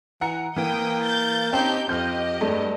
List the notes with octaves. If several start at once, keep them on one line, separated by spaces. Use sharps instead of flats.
E3 F#5 A#5 C#7
E3 A#3 G5 D#6
G6 A6
C4 C#4 D#4 G4 A5 G6
F2 G4 D#5 F6 G6
G2 G#3 A3